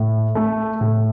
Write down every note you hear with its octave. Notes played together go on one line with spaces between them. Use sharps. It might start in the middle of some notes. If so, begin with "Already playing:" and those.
Already playing: A2
A3
A2